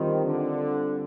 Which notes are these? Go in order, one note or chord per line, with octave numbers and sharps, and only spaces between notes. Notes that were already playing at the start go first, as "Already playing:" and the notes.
Already playing: D#3 G3 C4 F4
D3